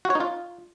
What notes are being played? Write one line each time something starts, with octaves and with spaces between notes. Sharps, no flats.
F#4
C#5
D#4
F4